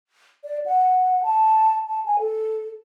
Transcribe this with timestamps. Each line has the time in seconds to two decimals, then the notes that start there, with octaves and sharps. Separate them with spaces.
0.44 D5
0.66 F#5
1.23 A5
1.87 A5
2.06 G#5
2.19 A4